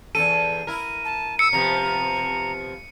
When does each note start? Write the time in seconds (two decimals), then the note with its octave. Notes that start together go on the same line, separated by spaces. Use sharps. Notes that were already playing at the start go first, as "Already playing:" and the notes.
0.15 E2 A2 A4 D#7
0.67 E4 A#4
1.05 A5
1.39 E6 C#7
1.53 C3 F3 B3 A#5